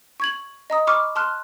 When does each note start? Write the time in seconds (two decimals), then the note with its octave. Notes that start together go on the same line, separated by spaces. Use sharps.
0.20 C#6 G#6 F#7
0.70 D#5 A#5 D#6
0.87 B5 C#6 D6 F6
1.16 A5 C6 F6 F#6